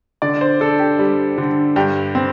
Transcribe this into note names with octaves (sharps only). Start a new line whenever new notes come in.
D3 D5
C5
D4 A4
G4
G3
D3
G2 G4
C4